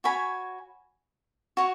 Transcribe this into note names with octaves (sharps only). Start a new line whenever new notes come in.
F#4 C#5 G#5 B5
F#4 C#5